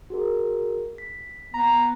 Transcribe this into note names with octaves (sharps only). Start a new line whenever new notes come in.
F#4 G#4 A#4
B6
B3 A#5